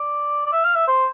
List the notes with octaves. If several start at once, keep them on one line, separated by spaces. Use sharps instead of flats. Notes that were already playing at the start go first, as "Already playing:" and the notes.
Already playing: D5
D5
E5
F5
E5
C5